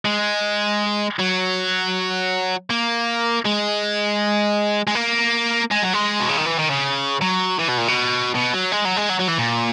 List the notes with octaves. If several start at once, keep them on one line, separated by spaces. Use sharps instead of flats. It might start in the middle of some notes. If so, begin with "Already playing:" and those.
G#3
F#3
A#3
G#3
G#3
A#3
G#3
F#3
G#3
B2
C#3
D#3
E3
D#3
C#3
F#3
E3
B2
A#2
B2
B2
F#3
G#3
F#3
G#3
F#3
F#3
E3
A#2